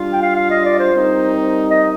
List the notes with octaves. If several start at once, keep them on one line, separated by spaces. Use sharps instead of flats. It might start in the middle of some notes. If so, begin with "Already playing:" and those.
Already playing: G3 D4 F4
G5
F5
F5
D#5
D5
C5
G3 C4 D#4 A#4
D#5